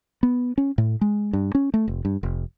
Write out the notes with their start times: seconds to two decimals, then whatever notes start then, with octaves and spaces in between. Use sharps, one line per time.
0.23 B3
0.58 C#4
0.78 A2
1.01 G#3
1.33 G2
1.55 C#4
1.74 A3
1.88 F1
2.05 G2
2.23 F1